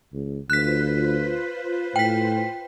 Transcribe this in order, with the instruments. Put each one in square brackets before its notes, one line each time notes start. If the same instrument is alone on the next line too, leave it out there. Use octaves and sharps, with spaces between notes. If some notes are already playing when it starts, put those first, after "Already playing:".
[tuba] C#2
[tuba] D2 [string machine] F4 B4 C5 [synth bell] F#6 B6
[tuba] A2 [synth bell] G5 B6